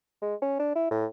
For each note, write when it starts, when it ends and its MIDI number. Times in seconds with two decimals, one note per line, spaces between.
0.22 0.35 56
0.42 0.58 61
0.59 0.74 62
0.75 0.87 64
0.91 1.05 45